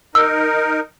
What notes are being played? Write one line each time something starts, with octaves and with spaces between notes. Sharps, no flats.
D#4 A#4 E6